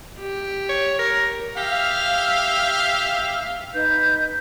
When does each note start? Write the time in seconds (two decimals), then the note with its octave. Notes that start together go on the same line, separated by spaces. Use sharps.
0.20 G4
0.69 C#5
0.99 A#4
1.58 G4 E5 F5
3.74 D#4 B4 G6